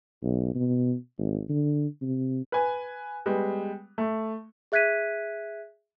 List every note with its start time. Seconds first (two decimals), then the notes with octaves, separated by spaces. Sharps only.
0.23 B1
0.55 B2
1.18 G#1
1.49 D3
2.01 C3
2.52 B4 G#5
3.26 G3 G#3 B3
3.98 A3
4.72 G#4 E5 F#6 G#6 B6 D#7